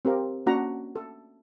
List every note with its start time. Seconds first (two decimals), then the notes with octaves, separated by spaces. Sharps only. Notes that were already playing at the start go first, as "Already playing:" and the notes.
0.05 C4 G4 A#4 F5
0.46 A#3 C#4 D4 F#4 F#5 A#5
0.96 A4